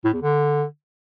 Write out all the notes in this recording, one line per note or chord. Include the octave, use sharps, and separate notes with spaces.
A2
E2
D3